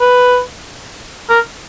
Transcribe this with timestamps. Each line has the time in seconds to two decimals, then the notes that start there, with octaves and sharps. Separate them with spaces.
0.01 B4
1.30 A#4